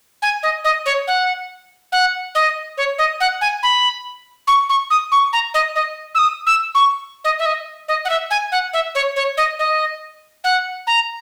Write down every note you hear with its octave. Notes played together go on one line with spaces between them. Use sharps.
G#5
D#5
D#5
C#5
F#5
F#5
D#5
C#5
D#5
F#5
G#5
B5
C#6
C#6
D#6
C#6
A#5
D#5
D#5
E6
D#6
E6
C#6
D#5
E5
D#5
D#5
F#5
E5
G#5
F#5
E5
C#5
C#5
D#5
D#5
F#5
A#5